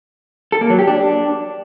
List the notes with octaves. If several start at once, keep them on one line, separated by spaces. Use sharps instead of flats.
A4
A#3
F#3
G4
D4